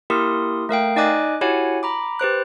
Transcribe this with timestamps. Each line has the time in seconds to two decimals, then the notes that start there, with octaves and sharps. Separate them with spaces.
0.10 A#3 E4 G4 A#4 C6 D#6
0.69 A3 A#4 F5 G5
0.96 D#4 D5 D#5 G#5 D6 F#6
1.41 E4 F#4 G4 C#5 F#5 G#5
1.83 A#5 B5 D6
2.19 G4 B4 C5 F#6